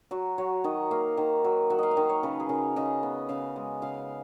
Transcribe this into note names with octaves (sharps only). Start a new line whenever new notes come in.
F#3 F#4
F#3 C#5
D#3 D#5
A#3 F5
D#3
F#3
F#3 F#5
D#5 F5
F5
D#3 D#5
C#5
C#3 B4
G#4
C#3 A#4
C#3 D#5
B3
C#3 F5
G#3
C#3 F5